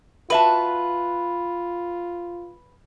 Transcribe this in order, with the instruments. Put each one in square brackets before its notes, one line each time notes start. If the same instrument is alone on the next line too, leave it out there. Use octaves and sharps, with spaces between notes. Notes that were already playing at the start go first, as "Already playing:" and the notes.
[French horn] F4 [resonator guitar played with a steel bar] F#4 E5 A5 [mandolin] B4